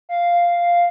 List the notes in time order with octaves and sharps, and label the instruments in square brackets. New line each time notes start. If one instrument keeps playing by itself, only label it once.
[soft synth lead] F5